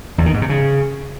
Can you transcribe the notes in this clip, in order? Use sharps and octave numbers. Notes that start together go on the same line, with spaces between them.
E2
D#3
G#2
C3
C#3